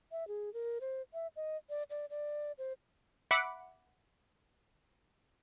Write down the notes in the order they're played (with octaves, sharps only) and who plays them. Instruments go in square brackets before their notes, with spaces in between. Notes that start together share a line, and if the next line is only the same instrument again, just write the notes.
[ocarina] E5
G#4
A#4
C5
E5
D#5
D5
D5
D5
C5
[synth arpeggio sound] E5 F#5 B5 D6